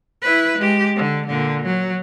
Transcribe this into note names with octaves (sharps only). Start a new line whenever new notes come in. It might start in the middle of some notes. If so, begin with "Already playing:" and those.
E4 B4
G#3 G4
D3
A#2 D3
F#3